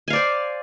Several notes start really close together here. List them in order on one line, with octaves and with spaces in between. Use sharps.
G#5 F5 D5 C5